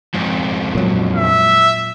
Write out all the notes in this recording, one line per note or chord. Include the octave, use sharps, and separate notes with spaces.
F2 G#2
A#2 F#3
E5